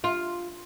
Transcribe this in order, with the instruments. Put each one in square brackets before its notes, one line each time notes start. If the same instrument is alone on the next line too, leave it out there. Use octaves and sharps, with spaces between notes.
[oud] F4